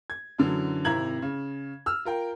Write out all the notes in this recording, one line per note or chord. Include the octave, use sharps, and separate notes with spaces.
G#6
F#2 D3 E3 F#3
G#1 C3 E4 A#5 G#6 F#7
C#3
E6 F6
F4 A#4 G5